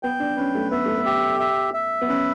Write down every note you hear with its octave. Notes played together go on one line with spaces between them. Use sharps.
B3 G5
D4
C#4 B4
A3
B3 E5
A3
B3
G4
E5
E5
B3
C#4 B4